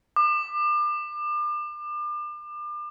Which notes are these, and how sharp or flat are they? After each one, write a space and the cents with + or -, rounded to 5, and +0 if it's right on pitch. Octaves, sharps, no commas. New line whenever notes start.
D6 +35